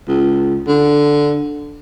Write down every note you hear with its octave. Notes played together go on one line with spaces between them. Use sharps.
C#2
D3